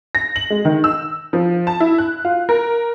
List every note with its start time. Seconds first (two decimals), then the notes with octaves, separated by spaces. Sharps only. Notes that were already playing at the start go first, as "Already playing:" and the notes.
0.15 A#6
0.36 F#7
0.50 G#3
0.65 D#3
0.84 E6
1.33 F3
1.67 A5
1.80 E4
1.98 F#6
2.25 F4
2.49 A#4